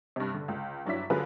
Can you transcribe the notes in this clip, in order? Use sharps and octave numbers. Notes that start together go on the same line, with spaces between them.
G2 C3
D3
C#2
G1 F#3 D4 E4 B6
D3 F#3 F4 G#4 A#4 B4